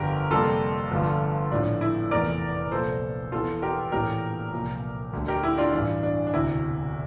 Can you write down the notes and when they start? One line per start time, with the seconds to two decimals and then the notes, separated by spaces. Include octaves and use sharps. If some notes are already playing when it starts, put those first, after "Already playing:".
Already playing: G1 F2 D3 G4 A#4
0.31 F2 C3 G3 A#3 F4 A4
0.91 G1 G2 D3 F3 A3
1.51 A#1 A2 F3 D4
1.81 E4
2.11 F1 E2 E3 A3 A#4 D5
2.72 C2 A#2 F3 A4 C5
3.32 E1 E2 E3 F4 A4
3.62 G4 A#4
3.92 A#1 A2 E3 A3 G4 A#4
4.53 C2 A#2 F3
5.13 D2 D3 A3
5.28 G4 A#4
5.43 E4
5.58 D4 F4
5.73 A1 G2 E3 D4
6.03 D4
6.27 D4
6.34 E1 D2 C3 E4